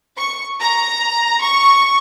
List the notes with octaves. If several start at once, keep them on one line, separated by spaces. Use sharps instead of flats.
C#6
A#5
C#6